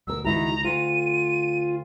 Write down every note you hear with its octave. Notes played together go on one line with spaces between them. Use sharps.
D2 B2 A#4 E6
C#2 D#3 E4 F#4 A#5
D2 F4 D#7